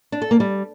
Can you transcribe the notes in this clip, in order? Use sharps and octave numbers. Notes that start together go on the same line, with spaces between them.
D4
A4
A#3
G3